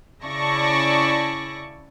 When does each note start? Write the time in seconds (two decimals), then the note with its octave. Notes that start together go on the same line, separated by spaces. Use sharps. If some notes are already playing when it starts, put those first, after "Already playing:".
0.22 C#3 E4 D5 A5 C#6 A#6